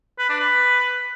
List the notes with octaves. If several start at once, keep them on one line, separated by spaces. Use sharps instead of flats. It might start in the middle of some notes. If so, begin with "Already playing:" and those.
B4
D4
B4